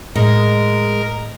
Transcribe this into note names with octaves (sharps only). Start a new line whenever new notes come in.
A2 G#3 A#4